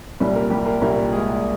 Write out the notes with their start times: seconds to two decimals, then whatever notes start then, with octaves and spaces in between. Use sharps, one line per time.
0.20 C2 A#2 G3
0.35 A#3 A#4
0.50 G3 G4
0.66 A#3 A#4
0.81 C2 A#2 G3 A#3 A#4
1.12 G#3 G#4